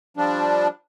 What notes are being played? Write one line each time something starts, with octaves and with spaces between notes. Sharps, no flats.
F3 G3 D4